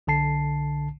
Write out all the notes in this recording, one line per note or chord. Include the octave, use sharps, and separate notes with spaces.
B1 D3 A5 C7